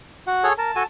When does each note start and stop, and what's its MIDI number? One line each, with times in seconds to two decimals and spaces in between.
0.27 0.48 66
0.27 0.48 78
0.44 0.53 68
0.44 0.53 69
0.44 0.53 73
0.58 0.71 70
0.58 0.86 81
0.76 0.83 66
0.76 0.83 69
0.76 0.83 80